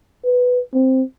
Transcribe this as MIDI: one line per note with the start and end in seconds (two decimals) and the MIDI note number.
0.24 0.60 71
0.73 1.02 60